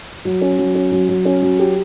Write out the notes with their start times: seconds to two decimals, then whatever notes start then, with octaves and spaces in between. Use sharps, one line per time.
0.25 F#3
0.41 C#4
0.58 F#3
0.75 C#4
0.92 F#3
1.09 F#3
1.25 C#4
1.42 F#3
1.59 G4